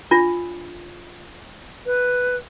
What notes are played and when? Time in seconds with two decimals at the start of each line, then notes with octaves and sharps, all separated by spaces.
0.11 D4 F4
1.85 B4